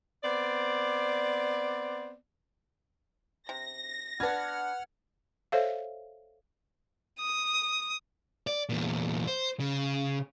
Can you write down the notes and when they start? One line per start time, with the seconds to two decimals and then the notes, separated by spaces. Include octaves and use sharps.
0.23 B3 C4 D5
3.49 C3 A#6
4.20 B3 D4 B4 F#5 F6 G#6
5.52 A4 C5 C#5 E5 F5
7.20 D#6
8.47 D5
8.69 E2 A#2
9.27 C5
9.60 C#3